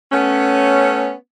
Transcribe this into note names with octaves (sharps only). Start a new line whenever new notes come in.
A3 B3 C#4